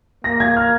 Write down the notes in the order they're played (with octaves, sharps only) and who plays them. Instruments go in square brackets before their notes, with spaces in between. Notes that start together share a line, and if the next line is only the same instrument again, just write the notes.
[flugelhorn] A#3 [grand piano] A#6
[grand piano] G#6
F6